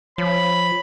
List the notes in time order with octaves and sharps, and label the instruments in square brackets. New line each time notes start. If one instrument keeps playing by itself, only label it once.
[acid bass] F3 [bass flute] C#5 [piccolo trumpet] B5